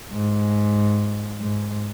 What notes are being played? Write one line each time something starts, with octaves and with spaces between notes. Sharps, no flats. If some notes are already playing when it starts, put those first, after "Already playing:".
G#2
G#2